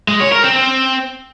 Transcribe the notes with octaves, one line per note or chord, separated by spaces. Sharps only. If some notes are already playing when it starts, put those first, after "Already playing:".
G#3
C#5
A#4
C4
C4